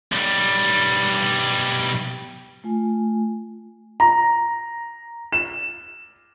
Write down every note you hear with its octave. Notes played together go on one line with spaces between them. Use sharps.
B1 G3
A3 F4 G#5
A#5
E7